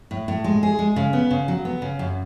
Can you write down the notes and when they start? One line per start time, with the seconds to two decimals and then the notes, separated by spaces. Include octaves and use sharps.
0.11 A2
0.28 A2
0.44 G#3
0.63 G#4
0.79 G#3
0.96 C#3
1.13 B3
1.31 C#3
1.48 F#3
1.65 B3
1.82 C#3
1.99 F#2